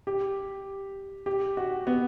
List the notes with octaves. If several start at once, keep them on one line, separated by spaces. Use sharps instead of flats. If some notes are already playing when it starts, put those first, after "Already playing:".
G4
G4
F#4
B3